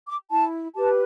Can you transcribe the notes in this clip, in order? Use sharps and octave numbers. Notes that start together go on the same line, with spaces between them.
D6
E4 A5
G4 B4 A5